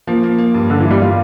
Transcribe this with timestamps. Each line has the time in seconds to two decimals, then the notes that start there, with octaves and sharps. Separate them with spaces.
0.07 F3 A#3
0.23 A#3
0.38 A#3
0.54 G2
0.70 G2 D3
0.80 E3
0.85 E4
0.91 G3
1.02 F4